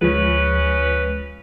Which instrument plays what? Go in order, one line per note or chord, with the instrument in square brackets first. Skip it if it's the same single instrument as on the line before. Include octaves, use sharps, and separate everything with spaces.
[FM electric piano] D2 F3 G#3 [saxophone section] C#3 C#4 B4